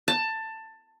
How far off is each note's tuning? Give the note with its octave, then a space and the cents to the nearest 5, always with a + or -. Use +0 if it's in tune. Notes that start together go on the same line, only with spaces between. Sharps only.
A5 +15